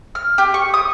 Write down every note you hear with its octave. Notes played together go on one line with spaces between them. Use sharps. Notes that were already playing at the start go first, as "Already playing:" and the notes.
F6
G4
C#6
D#6